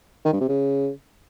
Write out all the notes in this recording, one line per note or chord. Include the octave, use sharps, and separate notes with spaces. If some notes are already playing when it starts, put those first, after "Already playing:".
D#3
G2
C3
C#3